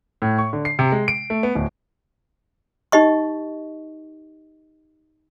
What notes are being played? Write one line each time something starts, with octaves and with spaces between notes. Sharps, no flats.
A2
C#6
D3
C7
C3
G#3
D7
A3
B3
D1
D#4 G4 D#5 C#6